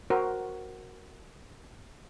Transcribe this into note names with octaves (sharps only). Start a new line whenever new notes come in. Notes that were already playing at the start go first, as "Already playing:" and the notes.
F#4 A#4 C5